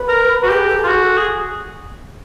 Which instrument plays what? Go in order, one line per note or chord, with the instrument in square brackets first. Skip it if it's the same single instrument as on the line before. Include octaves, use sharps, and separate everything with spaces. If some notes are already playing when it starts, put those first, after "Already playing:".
Already playing: [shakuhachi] B4
[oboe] A#4
F#4
[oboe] G4 [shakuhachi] G#4
[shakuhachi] A4
G#4
[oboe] F4
F#4
[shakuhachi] A4
[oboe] G#4